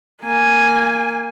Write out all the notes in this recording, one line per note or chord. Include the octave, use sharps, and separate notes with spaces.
A#3 G#5